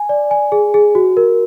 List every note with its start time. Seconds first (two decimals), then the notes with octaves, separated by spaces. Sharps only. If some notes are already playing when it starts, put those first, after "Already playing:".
Already playing: G#5
0.09 D5
0.31 G#5
0.52 G#4
0.74 G#4
0.95 F#4
1.17 A#4